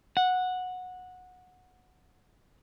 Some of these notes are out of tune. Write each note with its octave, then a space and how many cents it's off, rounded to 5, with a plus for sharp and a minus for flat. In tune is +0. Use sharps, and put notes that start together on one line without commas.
F#5 -15